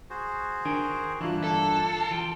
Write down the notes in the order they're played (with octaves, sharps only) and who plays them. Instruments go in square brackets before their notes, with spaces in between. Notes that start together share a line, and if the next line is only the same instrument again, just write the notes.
[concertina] F#4 G#4 C5
[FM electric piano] D#3 D4 [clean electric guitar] A#4 G5 G#5
[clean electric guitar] G2 D3 D4 [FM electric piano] E3 F4 [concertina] A#3 E4 F#6
[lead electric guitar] A4
[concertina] F5
[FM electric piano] E3 [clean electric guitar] F4 G5 C6